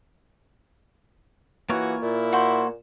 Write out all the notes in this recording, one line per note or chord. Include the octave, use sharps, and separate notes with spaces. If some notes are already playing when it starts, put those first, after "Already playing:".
E3 A#3 F4 F#4 C#5
A#2 E4
F#4 C5